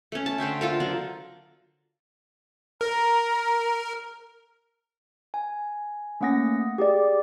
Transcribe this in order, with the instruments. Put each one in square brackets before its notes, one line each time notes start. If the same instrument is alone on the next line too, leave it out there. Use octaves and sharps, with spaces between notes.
[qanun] A3 C#4
A5
D3 C5 E5 G5
F4 A4 A#4
F#3 D4 F4
[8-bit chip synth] A#4 [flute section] A#5
[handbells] G#5
A3 A#3 C#4 F#5 D#6 A#6
G4 G#4 D5